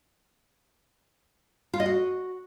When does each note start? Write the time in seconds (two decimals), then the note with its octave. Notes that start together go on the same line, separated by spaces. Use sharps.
1.73 F4
1.80 D#5
1.86 F#4